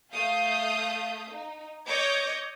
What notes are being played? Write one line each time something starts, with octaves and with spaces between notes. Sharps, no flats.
A3 F5 D#6 G6
D#4
C#5 D#5 D6 G6 G#6 A#6